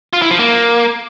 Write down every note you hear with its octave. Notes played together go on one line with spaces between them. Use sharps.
F4
E4
F3
A#3